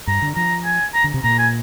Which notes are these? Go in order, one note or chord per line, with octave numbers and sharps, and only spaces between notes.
G2 A#5
D3
F3 A#5
G#5
A#5
D3
C3
A#2 A#5
G#5